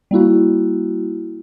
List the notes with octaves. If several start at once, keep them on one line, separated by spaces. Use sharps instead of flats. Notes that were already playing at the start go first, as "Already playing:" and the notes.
G3 A#3 E4 F#4